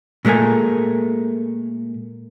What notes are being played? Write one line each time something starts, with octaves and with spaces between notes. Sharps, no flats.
A#2 G#3 A3 A#4 G#5